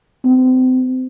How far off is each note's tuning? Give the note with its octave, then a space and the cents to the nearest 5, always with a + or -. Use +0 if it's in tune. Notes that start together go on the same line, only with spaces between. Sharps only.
C4 -30